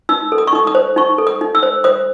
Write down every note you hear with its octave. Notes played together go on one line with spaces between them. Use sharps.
D#4 E6
A4
D#6
C#6
D#4 D#6
D#6
C5
D#4 C#6
A4
D#6
D#4
E6
C5
C5 D#6